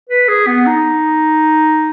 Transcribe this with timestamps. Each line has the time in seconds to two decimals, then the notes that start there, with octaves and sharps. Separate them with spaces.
0.09 B4
0.28 G#4
0.47 B3
0.66 D#4